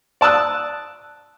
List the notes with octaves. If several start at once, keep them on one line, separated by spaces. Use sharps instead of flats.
D5 A5 D#6 E6 F#6